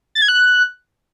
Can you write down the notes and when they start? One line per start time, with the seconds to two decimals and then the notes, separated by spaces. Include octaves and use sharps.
0.15 A6
0.22 G#6
0.28 F#6